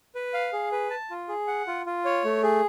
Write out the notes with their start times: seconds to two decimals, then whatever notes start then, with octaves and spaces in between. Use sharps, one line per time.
0.15 B4
0.34 F5
0.53 G#4
0.72 B4
0.90 A5
1.10 F4
1.28 G#4
1.47 F#5
1.67 F4
1.86 F4
2.05 C#5
2.24 A3
2.43 G#4